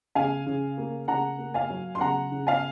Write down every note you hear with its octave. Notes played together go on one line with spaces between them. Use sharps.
C#3 F5 G#5
C#3
A#3
C#3 F#5 A#5
A#3
F5 G#5
F#3
C6
C#3 F#5 A#5
C#3
F5 G#5